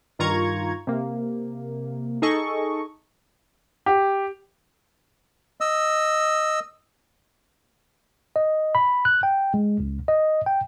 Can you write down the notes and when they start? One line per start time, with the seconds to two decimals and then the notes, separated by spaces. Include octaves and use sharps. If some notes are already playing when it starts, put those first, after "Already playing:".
0.19 G2 D#3 F4 A#5 C#6 G#6
0.87 C3 A#3
2.22 D#4 G#4 A4 D#5 C#6
3.86 G4
5.61 D#5 E6
8.36 D#5
8.75 B5
9.05 F#6
9.23 G5
9.54 G#3
9.80 C#2
10.08 D#5
10.46 G5